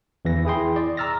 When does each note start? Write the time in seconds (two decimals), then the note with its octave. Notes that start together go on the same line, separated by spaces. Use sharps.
0.25 E2 E3 A#6
0.45 E4 G#4 G5 C6
0.76 D5
0.97 A#5 E6 F6 A6 A#6